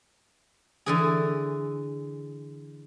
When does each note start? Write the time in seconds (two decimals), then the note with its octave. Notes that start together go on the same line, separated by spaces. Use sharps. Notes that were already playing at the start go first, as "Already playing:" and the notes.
0.86 D3 E3 G#4